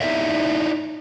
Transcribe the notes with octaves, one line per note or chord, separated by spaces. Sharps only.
D#4 E4 G#4 A#4 D5 E5